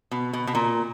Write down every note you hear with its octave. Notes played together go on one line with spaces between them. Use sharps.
B2
B2
B2
A#2